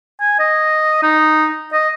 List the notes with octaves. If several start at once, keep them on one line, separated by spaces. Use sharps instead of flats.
G#5
D#5
D#4
D#5